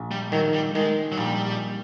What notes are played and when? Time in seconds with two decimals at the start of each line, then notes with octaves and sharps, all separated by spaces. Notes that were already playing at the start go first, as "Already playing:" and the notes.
Already playing: A#1
0.11 G3
0.32 D#3 F#3
0.54 G3
0.75 D#3 G#3
1.12 F#3
1.18 A#1 G3